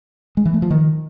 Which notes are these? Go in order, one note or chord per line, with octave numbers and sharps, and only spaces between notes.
G#3
E3
A3
F3
D#3